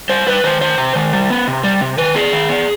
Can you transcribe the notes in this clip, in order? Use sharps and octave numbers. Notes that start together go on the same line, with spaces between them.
G3 C5
G3 B4
D#3 C5
D#3 C5
C3
D#3
G3
B3
C3
G3
C3
D#3 B4
B3 G#4
D#3
B3